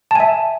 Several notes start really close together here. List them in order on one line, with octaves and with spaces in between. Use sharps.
A5 G#5 E5